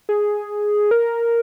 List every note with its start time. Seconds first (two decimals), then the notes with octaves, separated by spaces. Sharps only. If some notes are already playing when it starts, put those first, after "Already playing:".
0.09 G#4
0.91 A#4